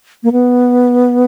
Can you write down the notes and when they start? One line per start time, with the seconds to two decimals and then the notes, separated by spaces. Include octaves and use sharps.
0.23 A#3
0.32 B3